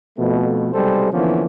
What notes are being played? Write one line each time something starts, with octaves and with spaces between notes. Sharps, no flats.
F2 B2 A3
B1 C3 G3 G#3 A4 C5
D3 E3 F3 A#3 B3 C#4